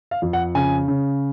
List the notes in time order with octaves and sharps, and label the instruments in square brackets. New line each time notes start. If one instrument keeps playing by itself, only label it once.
[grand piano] F5
F2
F#5
C#3 G#5
C#3